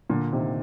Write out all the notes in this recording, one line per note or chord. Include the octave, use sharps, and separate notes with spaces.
A#2 D3
C3 D#3